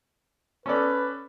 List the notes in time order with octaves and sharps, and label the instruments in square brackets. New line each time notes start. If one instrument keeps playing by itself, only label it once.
[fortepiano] C#4 A4 D5 [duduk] B4